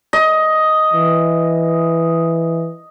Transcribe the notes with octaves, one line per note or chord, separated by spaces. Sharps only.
D#5
E3